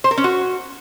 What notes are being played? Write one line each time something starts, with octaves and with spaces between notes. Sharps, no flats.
C5
A#4
C#4
F#4